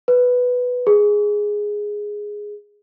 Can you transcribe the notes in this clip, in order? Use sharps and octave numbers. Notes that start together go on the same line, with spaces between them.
B4
G#4